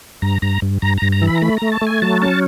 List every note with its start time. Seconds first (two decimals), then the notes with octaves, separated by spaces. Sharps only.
0.22 G2 A#5
0.42 G2 A#5
0.62 G2
0.82 G2 A#5
0.98 G2 A#5
1.12 A#5
1.22 E3
1.27 B5
1.35 A#5
1.42 A3 B5
1.57 A3 A#5
1.72 A5
1.81 A3
1.87 G#5
2.02 F#3 A5
2.22 C#4 A5